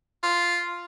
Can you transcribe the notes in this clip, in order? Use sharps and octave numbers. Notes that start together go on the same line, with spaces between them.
F4